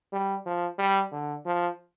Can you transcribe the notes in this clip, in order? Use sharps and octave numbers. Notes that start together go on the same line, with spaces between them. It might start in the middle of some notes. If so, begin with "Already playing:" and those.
G3
F3
G3
D3
F3